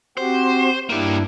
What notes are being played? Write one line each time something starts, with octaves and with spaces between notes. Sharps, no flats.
C4 F#4 G4 C5
G2 A#3 D4 E4 G4